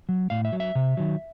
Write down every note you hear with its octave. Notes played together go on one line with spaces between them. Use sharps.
F#3
A2 F5
E5
F#3
E5
C3
D#3 F#3